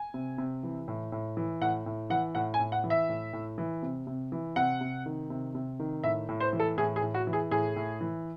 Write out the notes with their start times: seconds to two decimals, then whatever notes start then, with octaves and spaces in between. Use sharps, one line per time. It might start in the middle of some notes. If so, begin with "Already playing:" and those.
Already playing: G#5
0.14 C3
0.38 C3
0.63 E3
0.88 A2
1.12 A2
1.37 E3
1.61 A2 F#5
1.86 A2
2.10 E3 F#5
2.35 A2 F#5
2.54 G#5
2.60 A2
2.72 F#5
2.84 E3
2.90 E5
3.09 A2
3.33 A2
3.58 E3
3.82 C3
4.07 C3
4.32 E3
4.56 C3 F#5
4.81 C3
5.06 D#3
5.30 C3
5.55 C3
5.80 D#3
6.03 A2 E5
6.29 A2
6.40 C5
6.53 E3
6.60 A4
6.77 A2 G#4
6.96 G#4
7.02 A2
7.14 F#4
7.27 E3
7.33 G#4
7.51 A2 G#4
7.76 A2
8.01 E3